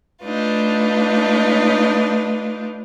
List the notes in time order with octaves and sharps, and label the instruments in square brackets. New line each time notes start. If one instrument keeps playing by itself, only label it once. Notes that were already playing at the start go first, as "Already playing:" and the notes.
[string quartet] A3 D4 D#4 F4 B4